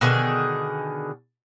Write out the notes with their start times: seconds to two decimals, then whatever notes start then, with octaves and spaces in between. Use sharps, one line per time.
0.01 B2 D3 D#3 G#4